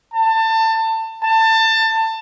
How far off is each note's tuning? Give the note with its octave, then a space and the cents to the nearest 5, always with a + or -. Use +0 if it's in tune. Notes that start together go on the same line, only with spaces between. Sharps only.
A5 +25
A5 +25